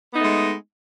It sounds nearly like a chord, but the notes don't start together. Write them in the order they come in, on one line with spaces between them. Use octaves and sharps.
B3 D#4 A3 G#3